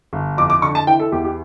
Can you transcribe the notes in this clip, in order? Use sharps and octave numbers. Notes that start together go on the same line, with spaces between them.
G1
F2 D6
D6
D3 C#6
A5
E3 G5
A4
E2 G4
G4